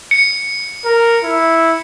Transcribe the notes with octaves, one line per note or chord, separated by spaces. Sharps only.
C#7
A#4
E4